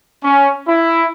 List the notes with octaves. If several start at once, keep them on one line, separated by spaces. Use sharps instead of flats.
C#4
E4